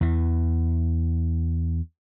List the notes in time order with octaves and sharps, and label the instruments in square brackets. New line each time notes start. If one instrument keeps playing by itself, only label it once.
[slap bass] E2 E3